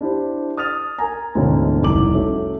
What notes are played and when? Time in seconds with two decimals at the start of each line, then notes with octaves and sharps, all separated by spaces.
0.01 D4 E4 G4 C5
0.57 D#6 F6 A6 F7
0.98 A#4 G#5 A#5
1.35 D2 G#2 B2 D3 E3 C#4
1.83 F1 C2 D#5 D6 F#7
2.14 A3 C#4 F#4 E5